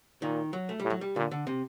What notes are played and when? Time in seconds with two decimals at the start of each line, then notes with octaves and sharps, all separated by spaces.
0.22 A#2 D#3
0.53 F#3
0.69 A3
0.80 A2 G3
0.90 F#3
1.01 G3
1.16 A#2 D3
1.31 D3
1.47 C3